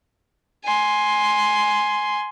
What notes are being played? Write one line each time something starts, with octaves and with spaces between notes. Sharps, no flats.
G#5 C6